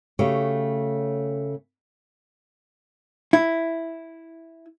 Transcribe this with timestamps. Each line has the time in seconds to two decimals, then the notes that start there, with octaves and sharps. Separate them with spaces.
0.19 C#3 A3 F#4 G4 C#5
3.33 E4